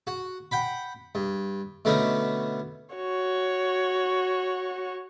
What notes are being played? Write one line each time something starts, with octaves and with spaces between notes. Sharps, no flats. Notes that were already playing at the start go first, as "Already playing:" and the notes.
F#4
F#5 G5 B5
G2
B2 D3 A3 B3 C#4 D#4
F#4 C#5